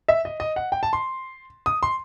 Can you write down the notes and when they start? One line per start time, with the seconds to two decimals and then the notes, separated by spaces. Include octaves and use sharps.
0.08 E5
0.25 D#5
0.40 D#5
0.56 F#5
0.72 G5
0.83 A5
0.93 C6
1.66 D#6
1.83 C6